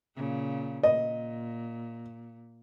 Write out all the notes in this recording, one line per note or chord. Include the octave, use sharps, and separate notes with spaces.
A#2 C#3
A#2 D#5